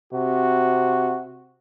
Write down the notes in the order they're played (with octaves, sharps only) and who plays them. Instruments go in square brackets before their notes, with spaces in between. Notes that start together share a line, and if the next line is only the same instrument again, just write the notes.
[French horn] C3 [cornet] F#4